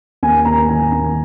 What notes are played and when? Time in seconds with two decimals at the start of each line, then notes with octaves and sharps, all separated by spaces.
0.23 D#2 G#5
0.39 G#5
0.45 D#2 A#5
0.69 D#3 G#5
0.92 D#2